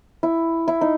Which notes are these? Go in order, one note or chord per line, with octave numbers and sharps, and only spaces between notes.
E4
E4
D#4